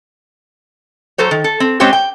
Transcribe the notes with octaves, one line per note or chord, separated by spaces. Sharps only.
F#3 A4 C5 C#5
D#3
A4
C4
G#3 C4 C#4 G4 C5 C#5
G5